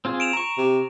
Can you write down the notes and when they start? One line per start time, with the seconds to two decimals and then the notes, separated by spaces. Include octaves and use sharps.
0.05 C4 F4 G#4
0.20 D7 E7 F7
0.33 A#5 C#6
0.58 C3